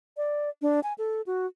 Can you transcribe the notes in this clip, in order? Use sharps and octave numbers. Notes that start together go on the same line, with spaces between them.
D5
D4
G#5
A4
F#4